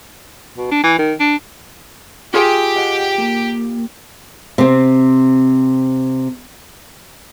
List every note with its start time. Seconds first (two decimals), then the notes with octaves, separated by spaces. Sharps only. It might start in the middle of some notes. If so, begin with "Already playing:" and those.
0.58 B2
0.71 D4
0.84 E3
0.99 D#3
1.20 D4
2.34 F4 G4 G#4
2.76 D#5 F#5
3.18 A#3
4.58 C3 C4